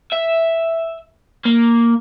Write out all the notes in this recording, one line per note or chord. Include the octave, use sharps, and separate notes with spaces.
E5
A#3